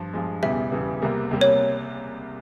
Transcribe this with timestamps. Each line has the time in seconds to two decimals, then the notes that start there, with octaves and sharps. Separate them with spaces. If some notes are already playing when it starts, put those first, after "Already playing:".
Already playing: G2 F3
0.13 G2 F3 G#3
0.42 E1 E2 C#3 E3 G3 E5
0.72 E1 E2 C#3 E3 G3
1.02 C2 C3 G3 A#3
1.31 C2 C3 G3 A#3
1.41 C#5